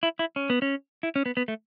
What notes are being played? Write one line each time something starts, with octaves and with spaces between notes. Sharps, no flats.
E4
E4
C#4
B3
C#4
E4
C#4
B3
B3
A3